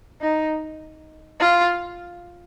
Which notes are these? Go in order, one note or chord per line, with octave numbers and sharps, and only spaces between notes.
D#4
F4